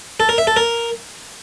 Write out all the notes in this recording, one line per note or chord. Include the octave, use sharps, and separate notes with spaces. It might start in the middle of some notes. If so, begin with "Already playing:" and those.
A4
A#4
E5
A4
A#4